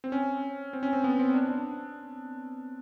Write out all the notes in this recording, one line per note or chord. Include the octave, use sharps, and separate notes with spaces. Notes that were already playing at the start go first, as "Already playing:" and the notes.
C4
C#4
C4
C#4
C4
B3
C4
D4
D4